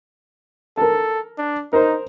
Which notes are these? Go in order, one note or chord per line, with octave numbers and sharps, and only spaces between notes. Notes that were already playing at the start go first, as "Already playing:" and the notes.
A4 A#4 A5
D4
D#4 A#4 C5